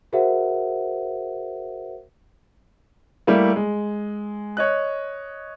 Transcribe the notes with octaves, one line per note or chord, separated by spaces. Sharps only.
F#4 G#4 A#4 C5 E5 F#5
G3 A3 A#3 E4
G#3
C#5 D#5 F#6